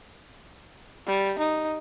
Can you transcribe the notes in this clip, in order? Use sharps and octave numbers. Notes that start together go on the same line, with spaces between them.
G3
D#4